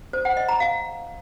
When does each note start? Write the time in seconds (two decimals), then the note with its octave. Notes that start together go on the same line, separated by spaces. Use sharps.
0.13 C5
0.25 F#5
0.37 D#5
0.49 A#5
0.60 F5